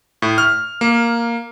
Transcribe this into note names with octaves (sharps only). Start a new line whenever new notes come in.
A2
F6
A#3